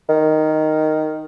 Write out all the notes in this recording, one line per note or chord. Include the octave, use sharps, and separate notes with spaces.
D#3